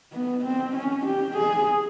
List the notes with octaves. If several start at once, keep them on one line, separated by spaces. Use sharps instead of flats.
B3
C4
C#4
G4
G#4